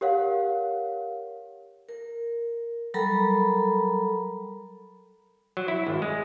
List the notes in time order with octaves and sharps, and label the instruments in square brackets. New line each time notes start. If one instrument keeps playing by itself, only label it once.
[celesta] G4 A#4 C#5 F5 F#5
[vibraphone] A#4
F#3 G3 A4 A#4 A#5 B5
[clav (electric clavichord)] F#3
E4
G#1
G#3